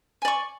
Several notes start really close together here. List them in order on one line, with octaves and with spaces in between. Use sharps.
G#5 D5 C#6